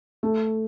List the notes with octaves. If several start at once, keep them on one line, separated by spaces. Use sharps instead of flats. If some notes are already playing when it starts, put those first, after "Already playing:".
A3